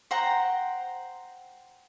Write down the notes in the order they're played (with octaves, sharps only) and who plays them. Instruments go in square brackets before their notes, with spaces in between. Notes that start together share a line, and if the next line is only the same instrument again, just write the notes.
[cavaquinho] C5 F#5 G5 A#5